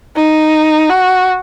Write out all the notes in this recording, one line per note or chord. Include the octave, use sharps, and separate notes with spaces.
D#4
F#4